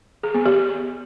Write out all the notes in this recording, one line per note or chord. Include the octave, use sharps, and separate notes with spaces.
G#4
B3
G4